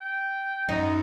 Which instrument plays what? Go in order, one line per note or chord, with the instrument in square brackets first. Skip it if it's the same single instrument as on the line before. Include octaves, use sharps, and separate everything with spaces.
[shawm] G5
[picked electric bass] F#2 [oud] D#4